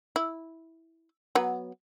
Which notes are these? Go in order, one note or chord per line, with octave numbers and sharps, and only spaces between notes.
E4
F#3 B3